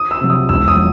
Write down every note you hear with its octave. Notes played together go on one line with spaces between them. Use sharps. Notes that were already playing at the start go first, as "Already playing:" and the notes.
Already playing: D#6
E6
C3 F#3
D#6
E1 E6
D#6
F#3